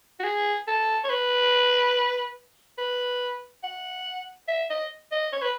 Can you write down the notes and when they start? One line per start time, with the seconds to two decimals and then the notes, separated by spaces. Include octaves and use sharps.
0.20 F#4
0.24 G#4
0.68 A4
1.04 C#5
1.10 B4
2.78 B4
3.64 F#5
4.48 E5
4.70 D#5
5.12 D#5
5.33 C#5
5.42 B4